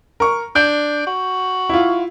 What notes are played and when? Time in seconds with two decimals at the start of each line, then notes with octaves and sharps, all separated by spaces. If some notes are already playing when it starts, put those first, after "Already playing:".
0.20 A#4 C#6
0.56 D4 G6
1.07 F#4
1.69 E4 F4